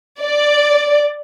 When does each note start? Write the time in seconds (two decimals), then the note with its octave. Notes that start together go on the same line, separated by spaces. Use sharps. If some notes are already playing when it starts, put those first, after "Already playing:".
0.21 D5